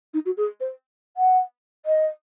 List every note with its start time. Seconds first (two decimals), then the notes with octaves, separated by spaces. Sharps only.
0.14 D#4
0.25 F#4
0.37 G#4
0.60 C5
1.17 F#5
1.85 D#5